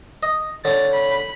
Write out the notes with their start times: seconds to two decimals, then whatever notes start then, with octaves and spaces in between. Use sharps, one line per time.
0.23 D#5
0.65 D3 C#5 A6
0.94 B5